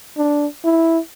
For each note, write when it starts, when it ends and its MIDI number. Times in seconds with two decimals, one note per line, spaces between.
0.17 0.47 62
0.65 0.99 64